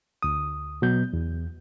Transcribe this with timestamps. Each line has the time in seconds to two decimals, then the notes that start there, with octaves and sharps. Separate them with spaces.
0.23 D2 D#6
0.82 B2 F#3 B3 G6
1.13 E2